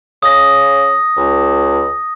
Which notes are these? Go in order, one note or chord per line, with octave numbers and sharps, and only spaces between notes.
C#3 D#6 A#6
C#2